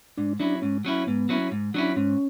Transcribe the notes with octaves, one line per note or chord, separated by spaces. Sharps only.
G#2 D4
F#3 C#4 D4 E4
G#2 C#4
F#3 C#4 E4
G#2 B3
F#3 C#4 E4
G#2
F#3 C#4 D4 E4
G#2 C#4